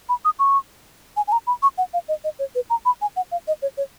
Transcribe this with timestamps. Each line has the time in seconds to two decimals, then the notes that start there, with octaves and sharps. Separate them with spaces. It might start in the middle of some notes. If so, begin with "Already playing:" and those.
0.09 B5
0.25 D#6
0.39 C#6
1.17 G#5
1.28 G#5
1.32 A#5
1.47 B5
1.63 C#6
1.78 F#5
1.93 F5
2.08 D#5
2.24 D#5
2.39 C#5
2.55 B4
2.70 A#5
2.86 B5
3.02 G#5
3.16 F#5
3.32 F5
3.48 D#5
3.62 C#5
3.77 C#5